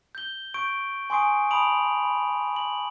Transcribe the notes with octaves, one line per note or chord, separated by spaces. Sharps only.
G6 G7
C#6 G6 D7
G#5 C6 C#6 D#6 C7 D7
A5 B5 D#6 D7 F7 F#7
B5
F#7